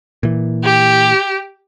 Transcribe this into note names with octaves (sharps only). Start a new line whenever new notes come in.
A#2 E3
G4